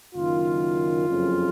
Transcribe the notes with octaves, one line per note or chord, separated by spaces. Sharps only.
F#1 F#2 D#3 F4
F#1 F2 C#3 F#3